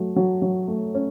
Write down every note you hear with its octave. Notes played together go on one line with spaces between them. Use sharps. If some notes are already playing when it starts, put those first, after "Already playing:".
Already playing: F#3 A3
F#3
F#3
A3
C#4